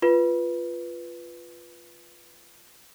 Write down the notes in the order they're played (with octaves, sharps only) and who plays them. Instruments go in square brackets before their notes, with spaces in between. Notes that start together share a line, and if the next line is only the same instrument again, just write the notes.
[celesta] F4 B4